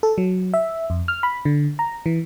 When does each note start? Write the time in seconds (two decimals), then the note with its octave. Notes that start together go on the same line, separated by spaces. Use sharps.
0.03 A4
0.18 F#3
0.54 E5
0.90 F2
1.08 F6
1.23 B5
1.45 D3
1.79 A#5
2.06 E3